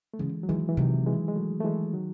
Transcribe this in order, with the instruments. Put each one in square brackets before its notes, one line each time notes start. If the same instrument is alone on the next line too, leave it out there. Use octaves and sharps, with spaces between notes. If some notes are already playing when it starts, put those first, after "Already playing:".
[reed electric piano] A3
[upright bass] C#3 [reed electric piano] E3 G#3
[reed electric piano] F#3
[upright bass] D#3 [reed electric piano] E3 G#3
[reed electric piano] E3
[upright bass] C3 [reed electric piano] D#3 F#3
[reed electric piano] E3 G#3
G#3
F#3 A3
A3
E3 G#3
D#3 F#3